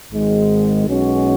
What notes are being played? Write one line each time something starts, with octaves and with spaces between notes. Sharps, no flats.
G#1 G#2 D#3 G#3
B1 B2 G#3 C#4 F#4